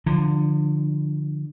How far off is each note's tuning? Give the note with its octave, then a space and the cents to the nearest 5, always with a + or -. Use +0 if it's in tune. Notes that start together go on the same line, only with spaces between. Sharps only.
D3 +10 F3 +0 D4 +35